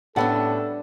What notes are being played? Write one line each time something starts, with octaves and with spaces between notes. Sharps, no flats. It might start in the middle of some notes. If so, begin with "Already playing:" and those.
A2 G3 B3 C#4 D4 A4 F#5 A5